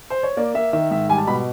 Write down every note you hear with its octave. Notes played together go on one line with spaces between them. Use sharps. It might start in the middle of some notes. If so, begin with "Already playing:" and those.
C5
C#5
A#3 D5
A#3 E5
D#3 E5
G#2 E5
G3 G#5
A5
B2 B5